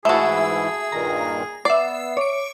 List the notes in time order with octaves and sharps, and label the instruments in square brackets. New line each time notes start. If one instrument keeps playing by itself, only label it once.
[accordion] G#2 E3 E4 [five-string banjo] A3 F#4 [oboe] G#4 [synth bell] E5 A5
[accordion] G2 A#2 D#3 [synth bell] A#5
[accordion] B3 [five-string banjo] D5 [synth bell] E5 C7
[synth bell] C#5 D7 [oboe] D6